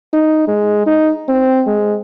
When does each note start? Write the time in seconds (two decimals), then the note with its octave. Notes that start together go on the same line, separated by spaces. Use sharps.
0.13 D#4
0.48 G#3
0.86 D#4
1.28 C4
1.67 G#3